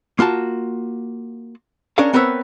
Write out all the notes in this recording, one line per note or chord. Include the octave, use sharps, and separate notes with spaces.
A#3 F4 F#4 A5
C#4 D4 G#4 A#4 C#5 F5
B3 C4 A#4 B4 C#5 E5